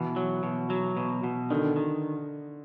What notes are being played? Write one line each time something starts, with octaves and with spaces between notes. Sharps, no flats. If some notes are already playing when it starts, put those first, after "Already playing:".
Already playing: B2 E3
F#3
B2
F#3
B2
B2
D3 D#3
D#3